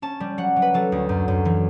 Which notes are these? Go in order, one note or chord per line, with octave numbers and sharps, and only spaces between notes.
C#4 A5
G3
F#3 F#5
F#3
B4
F#3 A4
D2
F#2
F#2
E3